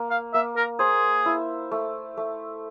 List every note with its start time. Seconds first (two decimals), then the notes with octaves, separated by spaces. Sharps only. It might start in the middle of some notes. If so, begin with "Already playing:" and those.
Already playing: A#3
0.10 F5
0.34 A#3 E5
0.56 A#4
0.79 G#4 C5
1.26 E4
1.71 A3
2.17 A3